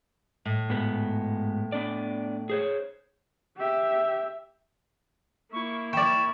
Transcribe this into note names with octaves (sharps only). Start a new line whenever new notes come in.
A2
G#2 B3
B3 D4 D5
G#4 C5 C#5
G4 E5
A#3 E4 C#6
D5 G5 C#6 E7